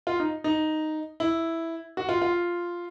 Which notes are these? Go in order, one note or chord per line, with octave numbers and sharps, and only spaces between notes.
F4
D#4
D#4
E4
F#4
F4
F4